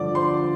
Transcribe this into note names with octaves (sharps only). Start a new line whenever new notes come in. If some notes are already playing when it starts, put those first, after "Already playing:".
Already playing: G2 D3 F3 D5 D6
C5 C6